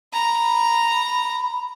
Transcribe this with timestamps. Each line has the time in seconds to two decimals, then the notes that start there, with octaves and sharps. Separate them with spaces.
0.13 A#5 B5